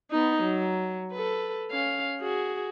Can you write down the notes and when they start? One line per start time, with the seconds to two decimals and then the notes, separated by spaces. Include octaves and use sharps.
0.11 B3 D#4
0.42 F#3
1.12 A4 B4
1.71 C#4 F5
2.21 F#4 G#4